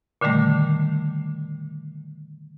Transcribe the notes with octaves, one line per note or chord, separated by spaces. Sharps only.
A#2 D3 D#3 G3 A3